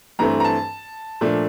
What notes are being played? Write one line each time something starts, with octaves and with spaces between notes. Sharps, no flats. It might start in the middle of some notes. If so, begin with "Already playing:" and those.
G2 E3 A3 C4 A#5
A#5
A5
A#2 F3 A3 D4